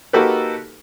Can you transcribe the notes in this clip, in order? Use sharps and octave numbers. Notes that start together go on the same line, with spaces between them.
A#3 D#4 F#4 G4 A4 B4